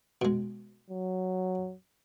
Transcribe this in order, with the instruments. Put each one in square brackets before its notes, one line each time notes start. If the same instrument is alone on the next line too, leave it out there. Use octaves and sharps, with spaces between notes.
[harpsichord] B2 G#3
[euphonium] F#3